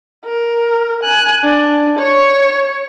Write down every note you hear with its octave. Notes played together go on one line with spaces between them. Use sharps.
A#4
G#5 F#6
D4
C#5 C#6